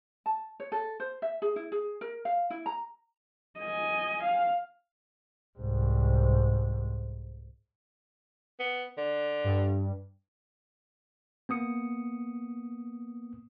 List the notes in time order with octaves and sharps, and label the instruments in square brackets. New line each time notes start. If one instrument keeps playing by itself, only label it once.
[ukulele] A5
C#5
A4
C5
E5
G#4
E4
G#4
A#4
F5
E4
A#5
[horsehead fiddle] D#5 G#5
F5
[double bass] C2 G#2
[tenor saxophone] B3
D3
[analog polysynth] G2
[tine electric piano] A#3 B3 D#6 C#7